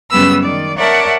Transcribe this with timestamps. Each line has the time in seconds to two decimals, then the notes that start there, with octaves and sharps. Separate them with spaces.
0.10 F#2 C#3 G3 B3 B4 E6
0.42 D#3 D5
0.77 A#4 C#5 D5 E5 F#5 A5